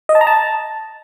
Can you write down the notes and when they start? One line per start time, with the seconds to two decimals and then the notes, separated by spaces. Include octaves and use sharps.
0.09 D#5
0.15 A5
0.21 A#5
0.27 A5